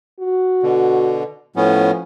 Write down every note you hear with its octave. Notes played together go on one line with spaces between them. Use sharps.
F#4
B2 D3
A2 F3 B3 C#4